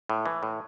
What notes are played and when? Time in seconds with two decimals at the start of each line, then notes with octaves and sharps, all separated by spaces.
0.10 A2
0.26 E3
0.43 A2